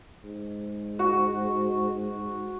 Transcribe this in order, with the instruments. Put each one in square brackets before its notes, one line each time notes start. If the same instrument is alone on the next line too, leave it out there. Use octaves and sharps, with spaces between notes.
[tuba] G#2
[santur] F#4